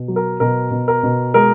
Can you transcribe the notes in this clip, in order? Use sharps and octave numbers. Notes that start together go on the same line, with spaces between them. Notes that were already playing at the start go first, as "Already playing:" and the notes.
Already playing: B2
F#3
A#4
B2 A#4
B2
A#4
B2
G#3 A#4